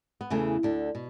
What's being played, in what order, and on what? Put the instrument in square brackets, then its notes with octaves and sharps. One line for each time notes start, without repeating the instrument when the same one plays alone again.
[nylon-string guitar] B3
E2 C#3 E3 A3
D2 D3
B2